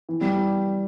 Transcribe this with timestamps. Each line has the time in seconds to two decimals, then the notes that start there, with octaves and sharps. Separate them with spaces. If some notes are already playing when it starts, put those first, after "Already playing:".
0.09 E3
0.21 G3